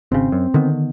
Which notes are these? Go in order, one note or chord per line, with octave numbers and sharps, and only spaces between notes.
G#1 C#3 C4
F#2
D3 D#3 B3